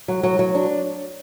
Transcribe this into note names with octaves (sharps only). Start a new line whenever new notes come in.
F#3
F#3
F#3
D4